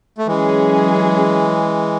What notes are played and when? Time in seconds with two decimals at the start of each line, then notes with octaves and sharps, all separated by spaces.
0.18 A3
0.27 E3 F#3 G#3 C#4 G#4